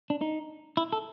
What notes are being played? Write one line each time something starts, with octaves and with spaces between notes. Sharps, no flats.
D4
D#4
E4
A4